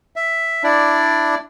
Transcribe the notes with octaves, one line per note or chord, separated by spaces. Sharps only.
E5
D4 E4 D5